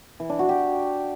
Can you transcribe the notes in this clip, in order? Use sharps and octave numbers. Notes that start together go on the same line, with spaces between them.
E3
D4
F#4
G4